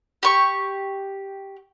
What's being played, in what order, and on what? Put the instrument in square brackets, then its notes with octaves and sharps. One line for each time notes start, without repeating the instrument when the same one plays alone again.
[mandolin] G4 C#6